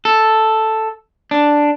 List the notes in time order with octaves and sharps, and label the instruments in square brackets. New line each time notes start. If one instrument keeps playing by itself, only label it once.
[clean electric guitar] A4
D4